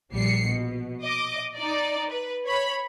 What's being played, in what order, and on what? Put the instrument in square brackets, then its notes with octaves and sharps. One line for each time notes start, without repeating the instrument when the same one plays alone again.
[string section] A#1 G3 C7 C#7
B2
D#5 D6
D#4 D5
B4
C#5 B5